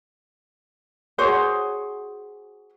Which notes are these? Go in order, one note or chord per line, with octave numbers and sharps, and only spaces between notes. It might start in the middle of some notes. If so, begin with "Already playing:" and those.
F#4 G#4 C5 C#5